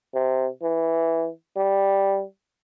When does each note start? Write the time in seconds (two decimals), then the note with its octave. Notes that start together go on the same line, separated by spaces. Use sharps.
0.14 C3
0.62 E3
1.57 G3